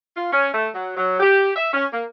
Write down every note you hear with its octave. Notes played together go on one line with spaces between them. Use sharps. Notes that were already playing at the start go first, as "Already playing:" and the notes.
F4
C#4
A3
F#3
F#3
G4
E5
C#4
A#3